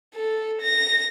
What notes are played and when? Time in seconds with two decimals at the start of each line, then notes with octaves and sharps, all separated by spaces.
0.14 A4
0.61 A#6